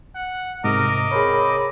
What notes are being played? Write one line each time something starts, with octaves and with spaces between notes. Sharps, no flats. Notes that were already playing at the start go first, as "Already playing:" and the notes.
F#5
G#2 C3 A#4 D#5 D6
C4 G#4 A#4 C#5 B5